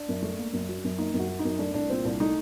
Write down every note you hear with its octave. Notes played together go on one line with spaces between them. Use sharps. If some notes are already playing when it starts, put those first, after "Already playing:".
Already playing: D4
F#2
A3
A#3
F#2
F#3
F#2
A#3 D#4
F#2
F#4
F#3
D#4
F#2
A3 D4
C2 D4
A#2 C4
C2 D4
A3 D#4